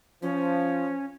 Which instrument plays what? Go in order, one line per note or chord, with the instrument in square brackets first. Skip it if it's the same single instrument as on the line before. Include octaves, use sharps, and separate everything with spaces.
[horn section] F3 [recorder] C#4